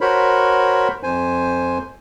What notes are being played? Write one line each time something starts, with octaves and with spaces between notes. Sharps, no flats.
F#4 A#4 C5 C#5 B5
F2 C5 G#5